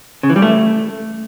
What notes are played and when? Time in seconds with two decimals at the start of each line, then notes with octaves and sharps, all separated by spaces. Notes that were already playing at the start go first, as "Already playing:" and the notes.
0.23 C#3
0.30 E3
0.36 G3
0.42 A3